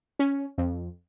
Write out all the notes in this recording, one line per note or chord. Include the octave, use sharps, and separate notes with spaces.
C#4
F2